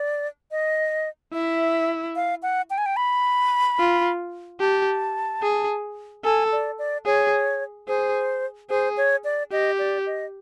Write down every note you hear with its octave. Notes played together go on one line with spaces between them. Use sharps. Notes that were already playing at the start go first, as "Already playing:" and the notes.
Already playing: D5
D#5
E4 E5
F5
F#5
G5
G#5
G5
B5
F4
G4 A5
G#4
A4 G#5
D5
D5
G#4 C#5
G#4 C5
G#4 C5
C#5
D5
G4 D#5
D5
D#5